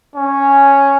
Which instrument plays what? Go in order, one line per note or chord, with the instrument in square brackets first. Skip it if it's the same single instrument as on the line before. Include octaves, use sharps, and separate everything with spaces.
[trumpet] C#4